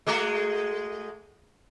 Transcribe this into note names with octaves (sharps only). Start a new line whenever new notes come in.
G#3 A3 F#4